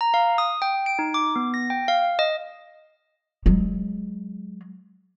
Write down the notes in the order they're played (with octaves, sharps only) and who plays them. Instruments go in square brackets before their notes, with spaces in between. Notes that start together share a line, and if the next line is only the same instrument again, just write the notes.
[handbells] A#5
F5
D#6
G5
D7
D#4
D6
B3
A#6
G5
F5
D#5
[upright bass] F#3 G#3